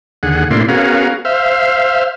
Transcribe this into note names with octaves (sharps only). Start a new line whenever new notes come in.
D#2 D3 G#4 F#5
A2 C3 A#3 D4 E4 C6
B3 C#4 F#4 G#4 A#4 F5
C5 E5 F5